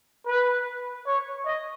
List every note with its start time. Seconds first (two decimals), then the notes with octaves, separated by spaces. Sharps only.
0.27 B4
1.06 C#5
1.46 D#5